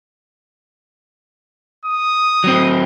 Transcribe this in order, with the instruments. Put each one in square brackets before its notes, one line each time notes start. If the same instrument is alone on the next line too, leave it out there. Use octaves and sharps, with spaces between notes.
[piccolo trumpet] D#6
[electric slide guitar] F#3 C4